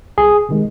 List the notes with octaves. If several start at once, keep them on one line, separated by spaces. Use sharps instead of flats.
C2 G#4
C3 D#3 G#3